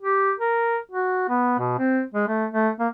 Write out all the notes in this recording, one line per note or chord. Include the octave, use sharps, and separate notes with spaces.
G4
A#4
F#4
B3
B2
C4
G#3
A3
A3
A#3